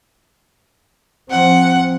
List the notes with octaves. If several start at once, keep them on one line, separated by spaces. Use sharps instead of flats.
F3 C4 F#5